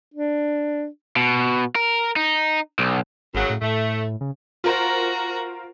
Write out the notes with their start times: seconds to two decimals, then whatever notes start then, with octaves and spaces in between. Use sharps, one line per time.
0.14 D4
1.16 B2
1.75 A#4
2.16 D#4
2.79 B1
3.34 G#1 F#2 C#3 F#3
3.50 A2
3.61 A2 A3
4.21 C#3
4.64 F4 F#4 A#4 C5 A#5